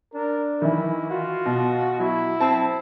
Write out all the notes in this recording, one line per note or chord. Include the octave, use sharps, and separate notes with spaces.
D4 A#4
D#3 E3 E4
F4 F#4
B2
F#3 E4
C4 A5